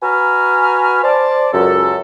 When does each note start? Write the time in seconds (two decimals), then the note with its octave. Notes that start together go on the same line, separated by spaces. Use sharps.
0.03 F#4 B4 G#5 A#5 B5 F6
1.04 C5 D5 A5
1.53 C#2 F#2 A4